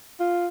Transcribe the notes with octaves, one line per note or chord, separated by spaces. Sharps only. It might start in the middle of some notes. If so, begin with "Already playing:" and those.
F4